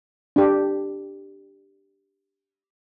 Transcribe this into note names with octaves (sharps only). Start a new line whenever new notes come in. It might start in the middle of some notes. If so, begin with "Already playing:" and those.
D4 G4